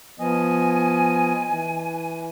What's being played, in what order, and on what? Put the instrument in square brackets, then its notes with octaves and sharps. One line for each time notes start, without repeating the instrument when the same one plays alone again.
[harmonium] F3 B3 D#5 [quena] G#5
[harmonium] E3